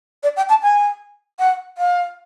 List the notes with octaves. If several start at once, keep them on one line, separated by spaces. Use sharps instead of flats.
D5
G5
A5
G#5
F#5
F5